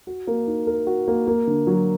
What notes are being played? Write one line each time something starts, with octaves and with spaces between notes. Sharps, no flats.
F#4
A#3
D#4
A#4
F#4
A#3
A#3
D3
F#3